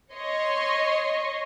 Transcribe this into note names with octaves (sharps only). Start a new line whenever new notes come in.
C#5 D#5 C6 C#6